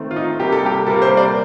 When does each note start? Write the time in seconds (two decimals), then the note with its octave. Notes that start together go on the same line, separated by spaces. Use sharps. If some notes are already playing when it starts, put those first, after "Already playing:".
Already playing: D#3 A3 C4
0.11 F4
0.16 D#4
0.40 C3 G3 A#3 G4
0.52 A4
0.66 G4
0.86 C3 G3 A#3 A4
1.02 C5
1.17 D5